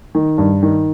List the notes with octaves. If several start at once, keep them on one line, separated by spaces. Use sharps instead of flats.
D#3
G2
D#3